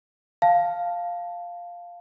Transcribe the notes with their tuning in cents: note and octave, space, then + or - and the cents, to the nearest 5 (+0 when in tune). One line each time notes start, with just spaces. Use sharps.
F5 +0 A5 +0